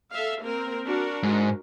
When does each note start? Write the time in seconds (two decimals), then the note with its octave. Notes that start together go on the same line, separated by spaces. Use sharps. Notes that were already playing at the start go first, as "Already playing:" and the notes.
0.12 A4 E5 F5
0.43 A#3 C4 A#4
0.85 D4 F#4 A#4
1.23 G#2